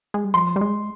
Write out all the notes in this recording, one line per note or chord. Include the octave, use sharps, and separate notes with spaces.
G#3
G3
F3 C6
G3
G#3